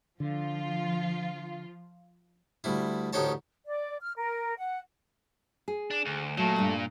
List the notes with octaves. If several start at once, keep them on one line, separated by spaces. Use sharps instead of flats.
D3 F3 F4
D2 G3 E4
A1 D2 D#4 G4 C#5 A5
D5
F6
A#4
F#5
G#4
D4
D2
A#2 F#3 A3
G2 G3